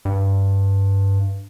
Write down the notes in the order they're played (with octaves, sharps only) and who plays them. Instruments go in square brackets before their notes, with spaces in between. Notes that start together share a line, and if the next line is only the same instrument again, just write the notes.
[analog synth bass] G2